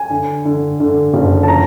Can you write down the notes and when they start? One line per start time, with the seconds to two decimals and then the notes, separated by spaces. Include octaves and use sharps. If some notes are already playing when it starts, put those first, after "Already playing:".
Already playing: G#5
0.10 D3
0.45 D3
0.80 D3
1.14 F#1
1.43 A5
1.48 F3 A#5